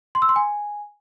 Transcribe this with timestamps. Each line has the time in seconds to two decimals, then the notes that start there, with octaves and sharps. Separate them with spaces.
0.15 C6
0.22 E6
0.29 C6
0.36 G#5